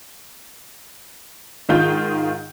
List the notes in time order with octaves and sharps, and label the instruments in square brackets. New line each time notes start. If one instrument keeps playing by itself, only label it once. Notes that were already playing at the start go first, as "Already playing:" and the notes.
[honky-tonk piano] G#2 D#3 F4 G6